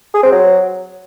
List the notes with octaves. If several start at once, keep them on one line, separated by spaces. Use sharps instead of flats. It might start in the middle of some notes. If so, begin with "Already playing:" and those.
G#4
C4
F#3